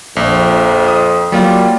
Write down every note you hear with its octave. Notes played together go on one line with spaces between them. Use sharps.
A#1 F2
D#6
F#3 G3 A#3 F4